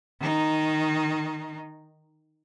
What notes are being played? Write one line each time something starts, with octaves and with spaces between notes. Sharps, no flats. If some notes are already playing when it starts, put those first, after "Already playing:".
D#3 D#4